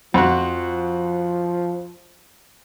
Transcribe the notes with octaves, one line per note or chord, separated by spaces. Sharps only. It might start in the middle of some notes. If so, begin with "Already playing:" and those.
F2 F3 F#4